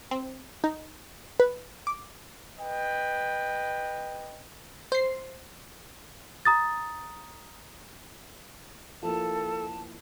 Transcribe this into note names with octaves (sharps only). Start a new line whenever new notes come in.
C4
D#4
B4
D6
B4 D#5 G5
C5 C7
A#5 D#6 A6
F3 A#3 E4 A4 A5